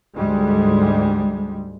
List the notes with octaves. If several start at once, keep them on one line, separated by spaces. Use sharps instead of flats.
D2 G#2 G3 G#3